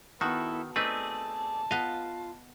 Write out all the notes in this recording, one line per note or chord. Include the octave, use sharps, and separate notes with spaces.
D#3 B3 E4 F#4 A4
A3 C4 D#4 G#4 B4 D5 A5
B3 F4 D#5 F5